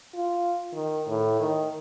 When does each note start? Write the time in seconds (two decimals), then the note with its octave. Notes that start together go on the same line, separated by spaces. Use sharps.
0.14 F4
0.73 D#3
1.07 A2
1.40 D#3